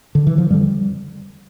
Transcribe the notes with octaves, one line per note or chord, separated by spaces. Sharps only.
D3
E3
F3
F2 D3 G3